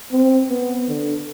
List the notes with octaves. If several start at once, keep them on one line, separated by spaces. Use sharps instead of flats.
C4
B3
D3